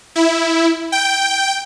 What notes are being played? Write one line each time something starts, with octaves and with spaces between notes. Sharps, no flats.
E4
G5